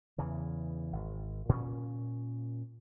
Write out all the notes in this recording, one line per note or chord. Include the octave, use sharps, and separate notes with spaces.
E2 C#3 E3
G#1
A#2 C#4